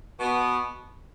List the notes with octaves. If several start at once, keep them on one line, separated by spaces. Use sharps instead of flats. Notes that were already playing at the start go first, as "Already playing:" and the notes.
B2 B3